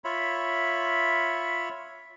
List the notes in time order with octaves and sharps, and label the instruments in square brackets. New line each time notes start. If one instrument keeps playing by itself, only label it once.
[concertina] F4 C#5 E5 B5